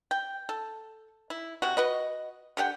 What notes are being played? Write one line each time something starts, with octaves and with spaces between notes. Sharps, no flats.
G5
A4
E4
C3 F#4
F#4 B4 D#5
D3 G4 F#5 G5